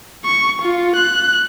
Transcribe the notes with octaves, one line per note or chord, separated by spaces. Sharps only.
C#6
F4
F#6